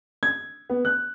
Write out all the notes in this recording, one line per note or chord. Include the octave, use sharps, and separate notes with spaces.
G#6
B3
F#6